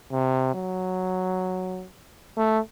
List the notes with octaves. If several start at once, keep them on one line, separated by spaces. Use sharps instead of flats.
C3
F#3
A3